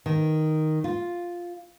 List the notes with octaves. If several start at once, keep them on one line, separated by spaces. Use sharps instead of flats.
D#3
F4